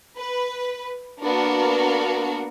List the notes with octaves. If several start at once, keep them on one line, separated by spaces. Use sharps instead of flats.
B4
A#3 B3 D4 F#4 A#4